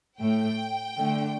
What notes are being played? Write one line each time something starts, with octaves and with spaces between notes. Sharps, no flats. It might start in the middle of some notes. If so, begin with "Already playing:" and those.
A2 A3 G5
D3 A3